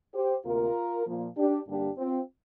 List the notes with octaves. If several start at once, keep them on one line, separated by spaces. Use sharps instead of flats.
G4 C5
D2 C3 A#3 F4 A#4
A#2 F3 A#3
D4 G4
G2 D3 G3 A#3 D4 G4
C4 F4